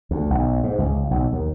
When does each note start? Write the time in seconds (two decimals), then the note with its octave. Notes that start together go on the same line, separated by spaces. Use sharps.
0.11 D2
0.30 B1
0.64 G#2
0.79 C#2
1.11 B1
1.33 D#2